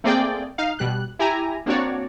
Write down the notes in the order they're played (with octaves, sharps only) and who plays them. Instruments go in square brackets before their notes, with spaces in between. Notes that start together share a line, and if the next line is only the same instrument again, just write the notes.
[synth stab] A3 A#3 C4 G#4 D5 G5
D#4 F5
B2 G3 F#6
E4 G4 G#5 A#5
A#3 C4 D4 F#4 C#5 D5